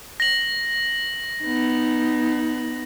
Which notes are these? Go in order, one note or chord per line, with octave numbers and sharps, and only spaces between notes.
A#6 F#7
B3 D#4